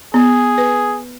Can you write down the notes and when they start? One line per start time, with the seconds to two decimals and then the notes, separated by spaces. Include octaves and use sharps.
0.14 B3 G#4
0.58 B4